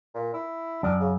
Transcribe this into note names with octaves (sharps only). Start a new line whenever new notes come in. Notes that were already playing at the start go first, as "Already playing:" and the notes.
A#2
E4
F#2 D4
C#3